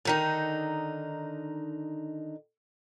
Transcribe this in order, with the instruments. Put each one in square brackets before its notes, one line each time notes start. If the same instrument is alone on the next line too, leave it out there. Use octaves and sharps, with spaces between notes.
[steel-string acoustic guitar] D3 D#3 D#4